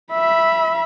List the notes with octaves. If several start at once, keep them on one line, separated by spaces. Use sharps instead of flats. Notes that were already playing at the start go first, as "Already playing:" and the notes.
E5 B5